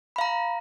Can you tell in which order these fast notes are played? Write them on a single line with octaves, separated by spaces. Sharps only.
B5 F5 A#5